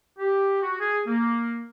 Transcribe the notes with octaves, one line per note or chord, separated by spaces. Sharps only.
G4
F#4
G#4
A#3